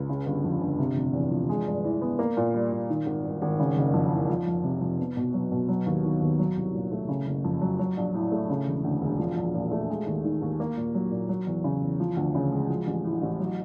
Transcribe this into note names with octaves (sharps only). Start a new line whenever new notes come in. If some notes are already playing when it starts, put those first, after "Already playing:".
Already playing: C#2
C#3
G1
F2
G1
C3
F1
E2
F3
G#3
G2
E3
B3
A#3
A#2
G3
A#2
D#3
G#1
G2
G#1
C#3
F#1
F2
E3
F3
F2
C3
F2
B3
B2
F#3
B2
F#3
D#2
D#3
D#2
F#3
C2
A#2
A3
C#3
F#1
F2
F#3
F#3
A#1
A2
A3
C#3
E1
D2
E1
F3
A#1
A#2
A3
G#3
D#2
D#3
D#2
A#3
A#2
F#3
A#2
F#3
E2
C#3
E2
F3
D2
C#3
G#3
F3
A1
A2
A1
F#3